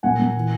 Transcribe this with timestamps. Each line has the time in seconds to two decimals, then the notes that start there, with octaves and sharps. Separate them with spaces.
0.03 A#2 F#5 G#5
0.20 A#2
0.36 E3